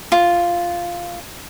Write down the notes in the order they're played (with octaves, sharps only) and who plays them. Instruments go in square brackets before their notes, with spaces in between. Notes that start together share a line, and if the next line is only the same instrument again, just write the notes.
[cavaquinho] F4